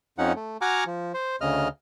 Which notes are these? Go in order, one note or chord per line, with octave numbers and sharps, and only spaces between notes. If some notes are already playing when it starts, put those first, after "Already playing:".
F2 F3 C#4 D#4 F#5
A3
F#4 F#5 G#5 A#5 D6 F6
F3
C5
D2 C#3 D#5 F6